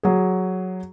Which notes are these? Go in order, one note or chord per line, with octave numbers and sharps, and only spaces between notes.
F#3 G#4